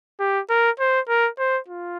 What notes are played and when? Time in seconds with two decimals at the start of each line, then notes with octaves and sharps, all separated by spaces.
0.20 G4
0.50 A#4
0.80 C5
1.08 A#4
1.39 C5
1.68 F4